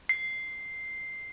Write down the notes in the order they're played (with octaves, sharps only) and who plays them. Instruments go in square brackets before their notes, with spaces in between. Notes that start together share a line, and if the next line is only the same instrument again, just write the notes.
[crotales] C7